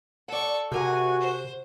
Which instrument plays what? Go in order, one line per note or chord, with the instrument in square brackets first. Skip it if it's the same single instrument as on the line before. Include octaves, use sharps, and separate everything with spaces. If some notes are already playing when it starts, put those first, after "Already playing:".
[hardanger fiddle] A4 C#6 [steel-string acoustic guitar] D5 F#5
[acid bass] C3 [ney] F#4 [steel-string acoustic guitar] G#4 A#4 F#5 [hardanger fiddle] G#5
[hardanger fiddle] C5